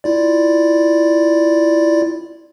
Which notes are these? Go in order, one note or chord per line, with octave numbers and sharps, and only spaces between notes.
E4 F4 D5